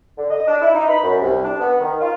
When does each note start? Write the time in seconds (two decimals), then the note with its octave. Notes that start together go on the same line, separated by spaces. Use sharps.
0.18 D3
0.31 D#5
0.48 D4
0.61 E4
0.74 D#4
0.89 B5
1.03 F#2
1.21 C2
1.44 D4
1.60 B3
1.80 D#3
2.00 F4